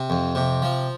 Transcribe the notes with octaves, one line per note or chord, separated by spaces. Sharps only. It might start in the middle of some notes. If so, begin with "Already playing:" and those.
Already playing: C3
F2
C3
F3